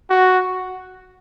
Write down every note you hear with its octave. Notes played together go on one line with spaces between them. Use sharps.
F#4